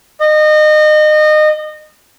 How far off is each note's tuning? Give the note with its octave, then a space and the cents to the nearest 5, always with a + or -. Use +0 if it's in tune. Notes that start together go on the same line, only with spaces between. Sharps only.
D#5 -30